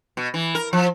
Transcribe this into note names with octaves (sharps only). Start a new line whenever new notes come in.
B2
E3
A#4
F3